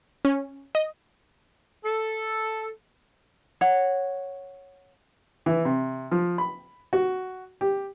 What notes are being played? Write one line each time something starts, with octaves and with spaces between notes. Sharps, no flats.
C#4
D#5
A4
C#5 F#5
E3
C3
F3
B5
F#4
G4